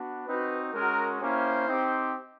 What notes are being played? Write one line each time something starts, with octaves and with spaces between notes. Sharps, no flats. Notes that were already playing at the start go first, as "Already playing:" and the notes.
Already playing: B3 D4 F#4
C4 D#4 F#4 B4
G#3 C#4 F#4 A#4
A#3 C#4 E4 G4 C5
C4 D#4 G4